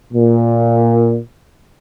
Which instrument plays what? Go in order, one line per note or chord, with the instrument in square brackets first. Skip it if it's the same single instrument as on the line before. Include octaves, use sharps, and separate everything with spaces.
[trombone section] A#2